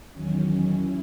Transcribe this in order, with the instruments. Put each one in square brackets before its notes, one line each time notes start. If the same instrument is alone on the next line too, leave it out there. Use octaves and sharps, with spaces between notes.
[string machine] E2 D#3 F#3 C#4
C#4 E4